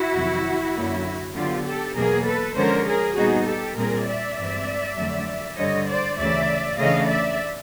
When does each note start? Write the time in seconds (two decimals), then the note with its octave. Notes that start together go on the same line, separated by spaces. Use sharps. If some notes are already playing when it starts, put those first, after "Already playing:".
Already playing: E4 F#4
0.14 F2 C3 D#3 F#3
0.75 F#2 D3 F#3 A#3 C#4
1.35 D3 F#3 B3 F4 G4
1.64 G4 A4
1.96 E2 B2 F#3 A#3 G#4 A#4
2.25 A4 B4
2.55 D3 F3 G#3 C#4 A#4 C5
2.86 G#4 A#4
3.16 A#2 G3 B3 D#4 F#4 G#4
3.45 G4 A4
3.76 A#2 G3 C4 G#4 A#4
4.07 D5 E5
4.37 G2 E3 G#3 C4
4.97 F2 D3 F#3 A3
5.57 G2 D3 G3 C#5 D#5
5.87 C5 D5
6.17 D2 C#3 E3 A3 C#4 D5 E5
6.79 C#3 E3 A3 D4 D#5 F5
7.08 D5 E5